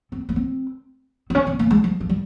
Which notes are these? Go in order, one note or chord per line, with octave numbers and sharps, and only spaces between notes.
C4
A#3
C4
C4
C#4
C4
A#3
G#3
F3
F3
G3